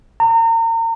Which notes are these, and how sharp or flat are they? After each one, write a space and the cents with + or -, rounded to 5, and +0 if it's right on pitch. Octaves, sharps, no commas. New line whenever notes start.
A#5 -35